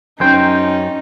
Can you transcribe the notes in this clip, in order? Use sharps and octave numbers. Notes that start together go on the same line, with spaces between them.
F#2 C#4 D#4 C5 G5